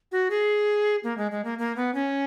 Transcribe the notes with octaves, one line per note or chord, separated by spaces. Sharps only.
F#4
G#4
A#3
G#3
G#3
A#3
A#3
B3
C#4